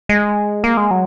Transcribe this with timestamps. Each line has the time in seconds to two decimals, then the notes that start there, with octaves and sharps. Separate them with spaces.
0.09 G#3
0.64 A#3
0.77 G#3
0.91 F#3